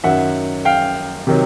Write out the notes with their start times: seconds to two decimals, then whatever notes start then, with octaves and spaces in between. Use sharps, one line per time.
0.04 F#2 D#3 F#3 E5 F#5
0.65 F5 G5
1.27 C3 D#3 F#3